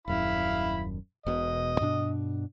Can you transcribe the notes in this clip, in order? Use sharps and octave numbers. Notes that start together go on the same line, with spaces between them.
D#1 F#2 E4 F5 B5
E1 B2 D#5
G2 B2 D4